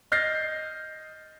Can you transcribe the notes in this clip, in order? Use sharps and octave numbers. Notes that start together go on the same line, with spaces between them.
D#5 F6 G6 A6 A#6 C7